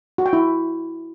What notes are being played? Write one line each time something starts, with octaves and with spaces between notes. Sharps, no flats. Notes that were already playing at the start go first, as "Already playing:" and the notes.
F#4
G5
E4